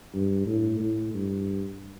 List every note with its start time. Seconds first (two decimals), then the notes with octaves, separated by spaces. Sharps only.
0.14 G2
0.47 A2
0.80 A2
1.14 G2